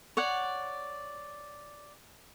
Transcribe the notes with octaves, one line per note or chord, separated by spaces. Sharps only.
C#5 D5 F#5